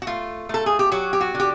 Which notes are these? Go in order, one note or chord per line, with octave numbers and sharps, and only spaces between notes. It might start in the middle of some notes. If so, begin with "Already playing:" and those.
F#4
A3 F4
A3 A4
G#4
G4
F#3 F#4
G4
F#4
D3
G4